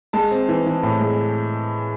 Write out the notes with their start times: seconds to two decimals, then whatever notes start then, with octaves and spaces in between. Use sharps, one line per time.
0.13 G#3 A5
0.31 C4
0.49 E3
0.66 E3
0.83 A2
1.01 G#3